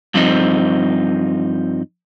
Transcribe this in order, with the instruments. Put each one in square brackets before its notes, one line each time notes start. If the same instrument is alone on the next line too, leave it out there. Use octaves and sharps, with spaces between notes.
[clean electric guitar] G2 F3 C4 D#4